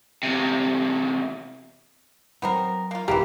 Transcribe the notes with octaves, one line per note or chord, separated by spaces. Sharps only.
E2 C3
F#3 B3 C4 A#4
A#3 F4
D1 E3 A#3 F4 G4